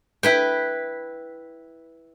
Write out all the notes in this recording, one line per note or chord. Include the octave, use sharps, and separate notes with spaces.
E4 B4 G5